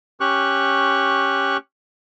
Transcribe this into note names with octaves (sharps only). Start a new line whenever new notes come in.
C#4 G4 C#6 F#6